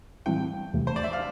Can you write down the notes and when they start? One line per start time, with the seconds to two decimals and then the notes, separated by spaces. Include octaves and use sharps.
0.26 A2 E3 G3 C4 E4 G5
0.73 E2 C3 E3 A3
0.87 C5
0.96 D5
1.03 E5
1.13 F5